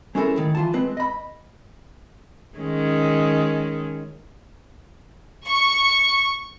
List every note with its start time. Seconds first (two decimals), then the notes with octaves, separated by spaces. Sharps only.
0.15 G#3 C#4 E4 A4 A#4
0.36 A2 D#3
0.55 E3 F4 A5
0.73 G#3 C4 B4
0.97 D#5 B5
2.58 D#3 G#3 C#4
5.48 C#6